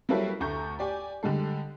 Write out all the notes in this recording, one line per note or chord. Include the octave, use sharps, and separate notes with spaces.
F#3 G3 A#3 E4 A4 B4
D2 A3 A#5 C#6 G6
G4 D5 G#5
D3 G3 G#3 A4